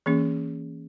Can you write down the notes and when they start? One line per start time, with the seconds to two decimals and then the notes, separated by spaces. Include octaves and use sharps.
0.06 E3 A#3 C#4 G#4